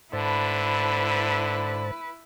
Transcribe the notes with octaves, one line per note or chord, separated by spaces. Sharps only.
G#2 D3 E4 B4 C5 A5